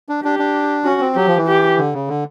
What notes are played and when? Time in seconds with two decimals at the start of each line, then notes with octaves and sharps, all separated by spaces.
0.09 D4
0.24 D4 G4
0.39 D4
0.85 C#4 F#4
1.00 C4
1.16 F#3 G4
1.27 F3
1.37 E3
1.48 G4
1.78 D3
1.93 C#3
2.08 D3